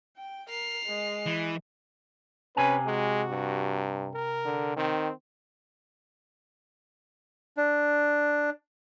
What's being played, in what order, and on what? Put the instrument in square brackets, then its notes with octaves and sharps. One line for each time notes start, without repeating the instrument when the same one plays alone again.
[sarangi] G5
[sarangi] A#4 [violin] C7 F7
[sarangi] G#3
[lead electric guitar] E3
[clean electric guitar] C3 G#5 [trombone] C#4 [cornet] B4
[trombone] G#3 [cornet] F#4
[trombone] G2
[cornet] A#4
[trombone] D3
[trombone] D#3 [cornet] C4
[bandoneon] D4